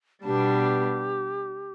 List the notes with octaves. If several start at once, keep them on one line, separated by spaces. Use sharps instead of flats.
B2 G3 B3 D4 G4